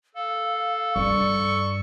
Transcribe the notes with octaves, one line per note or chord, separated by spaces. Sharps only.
A4 F5
G2 D5 C#6